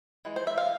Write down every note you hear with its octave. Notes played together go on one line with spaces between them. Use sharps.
E3 G#3
C5
E5
F5